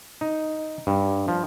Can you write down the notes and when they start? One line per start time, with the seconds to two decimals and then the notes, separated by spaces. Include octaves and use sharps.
0.21 D#4
0.87 G2
1.28 F3